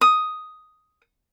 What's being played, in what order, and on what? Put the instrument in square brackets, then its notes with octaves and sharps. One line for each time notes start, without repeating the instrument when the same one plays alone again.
[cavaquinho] D#6